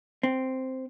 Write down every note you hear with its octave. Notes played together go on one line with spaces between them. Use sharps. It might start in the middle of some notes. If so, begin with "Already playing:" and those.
C4